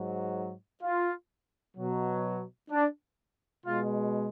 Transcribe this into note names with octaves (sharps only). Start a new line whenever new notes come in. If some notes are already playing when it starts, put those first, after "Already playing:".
Already playing: G#2 F#3
F4
B2 F#3
D4
B2 G#3 F4